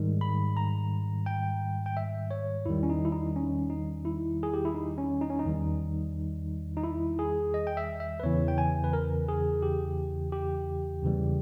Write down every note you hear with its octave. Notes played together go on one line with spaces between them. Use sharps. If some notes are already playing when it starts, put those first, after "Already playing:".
Already playing: G#2 D#3 G3
B5
A#5
G5
G5
E5
C#5
E2 D#3 G3 E4
C#4
D#4
E4
D#4
C#4
D#4
E4
G#4
G4
E4
D#4
C#4
D#4
C#4
D#4
E2 D#3 G3
D#4
E4
G#4
D#5
G5
E5
E5
B4
E2 C#3 E3 C#5
G5
G#5
B4
A#4
G#4
G4
G4
E2 C#3 E3 G3